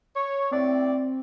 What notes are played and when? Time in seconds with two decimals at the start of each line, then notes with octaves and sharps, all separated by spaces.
0.16 C#5
0.51 A2 C4 D5